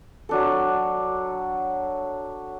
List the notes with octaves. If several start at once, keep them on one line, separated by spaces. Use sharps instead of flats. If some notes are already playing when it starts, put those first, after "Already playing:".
F#3 D4 A4